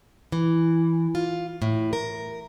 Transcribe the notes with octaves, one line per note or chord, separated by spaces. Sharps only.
E3
F4
A2
A#4